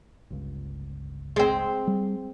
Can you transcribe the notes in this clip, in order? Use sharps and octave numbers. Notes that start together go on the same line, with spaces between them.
G1 C#2
G#3 C4
G3